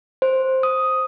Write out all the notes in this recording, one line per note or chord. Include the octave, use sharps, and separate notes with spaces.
C5
D#6